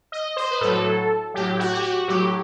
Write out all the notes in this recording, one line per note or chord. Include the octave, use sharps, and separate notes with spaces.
D#5
C5
B4
A2 F#3 A4
A2 F#3 G4
F#4
G4
F#4
A2 F#3 G4